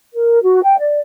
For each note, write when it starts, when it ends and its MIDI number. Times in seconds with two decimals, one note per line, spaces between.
0.14 0.40 70
0.43 0.62 66
0.63 0.79 79
0.79 1.00 74